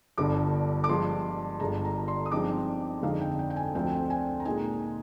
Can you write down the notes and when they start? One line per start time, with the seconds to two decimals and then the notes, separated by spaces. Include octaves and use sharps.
0.18 G1 G2 D3 D6
0.84 D6
0.89 G2 F3 G#3 C6
1.60 G1 G2 D3 G#3 A#5
1.85 A#5
2.08 C6
2.26 D#6
2.31 G2 F3 G#3 C4 D#4 D6
3.03 F2 D3 G#3 D#4 F5
3.21 G5
3.39 G5
3.50 G5
3.56 G#5
3.75 D2 D3 F3 C4 G5
4.10 G#5
4.40 A#5
4.45 A#2 G#3 D#4 G#5